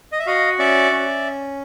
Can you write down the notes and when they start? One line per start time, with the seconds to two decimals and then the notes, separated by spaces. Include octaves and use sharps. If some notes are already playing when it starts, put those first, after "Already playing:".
0.12 D#5
0.19 E5
0.26 F#4 D#5 F5
0.59 C#4 D5 E5
0.92 C#4